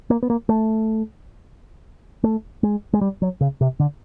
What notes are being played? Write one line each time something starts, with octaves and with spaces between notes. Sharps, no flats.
A#3
B3
A#3
A3
A3
G#3
G#3
G3
F#3
C#3
C3
D3